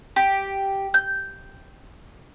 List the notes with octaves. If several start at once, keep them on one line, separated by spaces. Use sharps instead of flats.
G4
G6